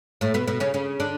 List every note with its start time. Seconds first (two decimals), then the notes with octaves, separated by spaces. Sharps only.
0.21 A2 A3
0.34 B2 B3
0.48 B2 B3
0.60 C#3 C#4
0.74 C#3 C#4
1.00 D3 D4